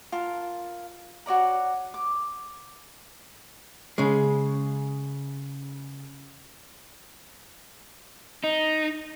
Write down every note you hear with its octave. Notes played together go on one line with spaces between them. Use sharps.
F4 A#4 A5
F#4 C#5 D5 A#5
D6
C#3 G#3
D#4